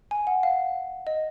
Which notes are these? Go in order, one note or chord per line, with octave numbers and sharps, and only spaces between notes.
G#5
F#5
F5
D#5